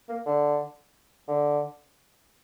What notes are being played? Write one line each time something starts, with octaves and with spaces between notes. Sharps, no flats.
A#3
D3
D3